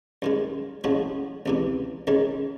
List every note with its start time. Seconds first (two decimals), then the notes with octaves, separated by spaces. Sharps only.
0.22 F#2 D#3 G#3
0.84 A2 F3 G#3 C#4 F#4
1.46 C#2 C3 E3
2.07 G#2 D#3 G#3 C#4